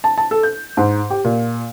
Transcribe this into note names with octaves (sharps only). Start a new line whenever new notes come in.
A5
A5
A4
G6
G#2
G4
A#2